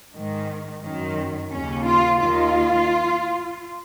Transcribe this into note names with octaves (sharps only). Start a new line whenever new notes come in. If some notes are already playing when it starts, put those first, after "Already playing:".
G#2 D#3
F#2 D#3
D#2 C#3 C#4
F4
D#2 D#3 F4